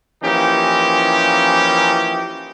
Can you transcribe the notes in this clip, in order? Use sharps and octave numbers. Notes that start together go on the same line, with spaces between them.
E3 F3 A#3 C#4 D#4 G4